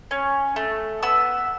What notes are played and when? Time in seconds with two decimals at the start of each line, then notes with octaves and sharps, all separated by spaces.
0.11 C#4
0.56 A3
1.03 B3 E6